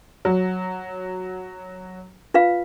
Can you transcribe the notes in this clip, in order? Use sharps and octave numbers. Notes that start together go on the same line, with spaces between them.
F#3
F4 B4 F5